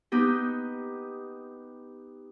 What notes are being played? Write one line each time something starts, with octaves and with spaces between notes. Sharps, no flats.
B3 D#4 G4